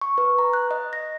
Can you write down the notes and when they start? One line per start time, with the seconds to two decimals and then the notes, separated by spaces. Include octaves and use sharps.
0.01 C#6
0.18 B4
0.38 A#5
0.53 F#6
0.71 D#5
0.93 A#6